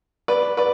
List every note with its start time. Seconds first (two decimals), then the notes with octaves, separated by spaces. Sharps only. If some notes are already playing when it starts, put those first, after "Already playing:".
0.28 B4 D5
0.57 B4 D5